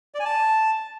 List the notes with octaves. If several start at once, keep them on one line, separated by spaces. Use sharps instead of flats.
D5
G#5
A5